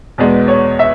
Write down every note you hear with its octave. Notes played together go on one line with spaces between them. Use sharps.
E2 B2 G#3 B3 D5
C#5
E5